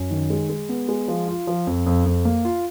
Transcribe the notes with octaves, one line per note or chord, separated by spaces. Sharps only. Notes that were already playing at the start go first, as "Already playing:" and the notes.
Already playing: F#2
D#3
G#3
G#3
B3
G#3
F3
F4
F3
F2
F2
F2
A#3
F4